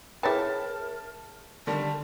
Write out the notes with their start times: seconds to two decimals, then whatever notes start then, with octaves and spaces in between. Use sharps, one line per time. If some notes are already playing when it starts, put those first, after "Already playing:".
0.23 E4 G#4 A#4 B4 C#5 G5 A5 A6
1.67 D3 D#3 G3 A5